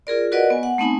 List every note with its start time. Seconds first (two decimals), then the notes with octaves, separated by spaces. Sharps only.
0.07 F4 G#4 A#4 D5
0.32 F#4 A#4 B4 D5 D#5 F#5
0.50 B3 G#5
0.63 F#5
0.78 A3 B3 C4 D#4 G#5 B5